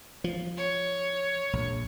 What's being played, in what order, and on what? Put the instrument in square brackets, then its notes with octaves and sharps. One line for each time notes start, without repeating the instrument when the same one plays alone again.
[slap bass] F3
[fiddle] C#5
[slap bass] A#1